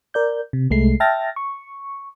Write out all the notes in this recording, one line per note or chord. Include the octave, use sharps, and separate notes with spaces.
A#4 D5 G6
C3
C2 G#3 A3 C7
E5 G5 A5 F6 A6 A#6
C#6